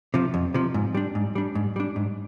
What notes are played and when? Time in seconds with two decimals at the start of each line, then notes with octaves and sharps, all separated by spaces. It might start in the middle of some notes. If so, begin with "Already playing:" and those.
0.14 C3 F3
0.34 F2
0.54 C3 F3
0.74 G#2
0.95 G3 D4
1.15 G#2
1.35 G3 D4
1.55 G#2
1.76 G3 D4
1.96 G#2